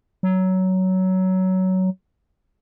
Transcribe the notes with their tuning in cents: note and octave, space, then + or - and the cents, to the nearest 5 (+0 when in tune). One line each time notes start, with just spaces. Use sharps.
F#3 +15